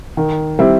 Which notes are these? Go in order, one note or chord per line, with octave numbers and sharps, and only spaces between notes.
D#3
G3 C4 E4